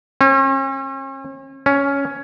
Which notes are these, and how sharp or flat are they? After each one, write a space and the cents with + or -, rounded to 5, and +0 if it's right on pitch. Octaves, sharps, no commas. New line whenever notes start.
C#4 -45
C#4 +5